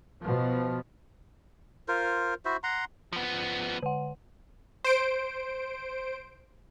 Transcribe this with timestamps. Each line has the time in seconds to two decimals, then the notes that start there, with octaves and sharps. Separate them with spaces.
0.20 B2 F3
1.88 F4 A#4 C5
2.45 E4 F#4 C5 E5
2.63 F#5 A#5 C6
3.13 F3 B3
3.29 D#7 F#7
3.83 D3 F#5
4.85 C5 D7